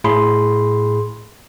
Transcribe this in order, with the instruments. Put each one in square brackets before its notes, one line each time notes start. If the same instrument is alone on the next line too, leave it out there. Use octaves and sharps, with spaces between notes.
[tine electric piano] A2 G#4 B5 C6